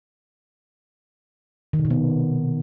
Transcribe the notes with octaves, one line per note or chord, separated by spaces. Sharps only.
D#3
C3
B2
B3